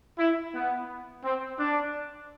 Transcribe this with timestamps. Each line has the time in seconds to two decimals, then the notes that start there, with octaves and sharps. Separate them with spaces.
0.17 E4
0.53 B3
1.23 C4
1.58 D4